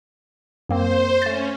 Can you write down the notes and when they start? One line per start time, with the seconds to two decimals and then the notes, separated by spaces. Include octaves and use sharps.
0.69 F#2 A#3 C4 C5
1.22 A3 C#4 A6